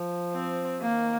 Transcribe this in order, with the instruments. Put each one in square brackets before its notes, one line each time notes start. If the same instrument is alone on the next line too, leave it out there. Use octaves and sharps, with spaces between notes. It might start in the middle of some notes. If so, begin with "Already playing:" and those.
Already playing: [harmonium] F3
[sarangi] C4
[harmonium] D#3 [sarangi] A#3